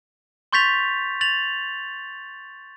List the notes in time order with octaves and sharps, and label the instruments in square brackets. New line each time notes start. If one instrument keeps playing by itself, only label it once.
[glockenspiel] C6 C#6 G6 A6 B6 F7
A6 F7 F#7